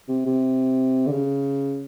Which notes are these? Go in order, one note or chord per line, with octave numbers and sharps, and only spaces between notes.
C3
C3
D3
C#3